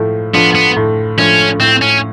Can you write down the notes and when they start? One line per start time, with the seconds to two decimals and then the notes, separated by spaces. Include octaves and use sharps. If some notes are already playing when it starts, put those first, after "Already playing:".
Already playing: A2 F3 A3
0.34 F3 A3 B3 D4 F4
0.55 B3
0.76 A2
1.18 F3 A3 C#4 D4 F4
1.60 A2 C4
1.82 C#4